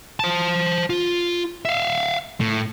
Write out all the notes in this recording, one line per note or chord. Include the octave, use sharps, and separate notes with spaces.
C5 A5
F4
E5 F5
A2